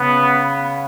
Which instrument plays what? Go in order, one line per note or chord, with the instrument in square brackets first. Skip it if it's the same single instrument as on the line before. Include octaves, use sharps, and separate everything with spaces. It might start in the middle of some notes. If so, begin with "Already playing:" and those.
Already playing: [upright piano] C#3 [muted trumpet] B3